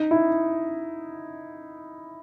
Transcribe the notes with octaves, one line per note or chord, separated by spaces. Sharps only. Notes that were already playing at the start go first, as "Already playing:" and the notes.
Already playing: D#4
E4